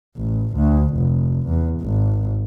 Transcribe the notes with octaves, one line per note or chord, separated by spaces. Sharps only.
A1
D2
F1
E2
G#1